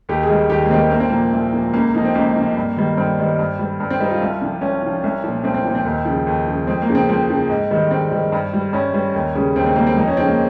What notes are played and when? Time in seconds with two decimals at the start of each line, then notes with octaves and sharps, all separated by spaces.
0.09 D#2 G4
0.23 G#4
0.29 D#3 G3
0.50 D#2 G4
0.66 A#3
0.71 D#3 G3 C4
0.91 C2 A#3
1.00 C4
1.10 A#2 F3 A#3
1.32 C2
1.53 A#2 F3
1.74 C#2 A#3
1.94 C3 F3 D#4
2.05 C4
2.15 C#2 A#3
2.36 C3 F3
2.57 G2
2.76 D#3 G3
2.97 G2 C4
3.18 D#3 G3
3.39 G2
3.59 G3
3.80 G2
3.90 C4
4.00 G3 D#4
4.11 F4
4.21 C2
4.41 C3 F3
4.61 C2 C#4
4.82 C3 F3
5.04 C2
5.24 A#2 F3
5.44 C2 C4
5.54 C4
5.64 A#2 F3
5.75 C4
5.85 D#2
6.05 C#3 F3
6.27 D#2
6.47 C#3 F3
6.67 F2 C4
6.82 A#3
6.88 C#3 F3
6.95 C4
7.09 F2 C4
7.30 C#3 F3
7.49 G#2
7.71 D#3 G3
7.91 G#2 C4
8.12 D#3 G3
8.32 G2
8.53 G3
8.73 G2 C#4
8.94 G3
9.14 D#2
9.35 C#3 G3
9.56 D#2 C4
9.66 C4
9.76 C#3 G3 A#3
9.87 C4
9.96 F2 D#4
10.07 C#4
10.17 C#3 F3 C4
10.28 A#3